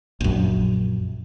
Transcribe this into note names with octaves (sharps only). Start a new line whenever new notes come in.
A#1 F#2